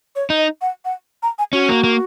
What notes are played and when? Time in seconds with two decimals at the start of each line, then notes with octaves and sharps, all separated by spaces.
0.15 C#5
0.30 D#4
0.37 D#5
0.61 F#5
0.85 F#5
1.23 A#5
1.38 G#5
1.53 C#4 F#4
1.69 A#3
1.84 A#3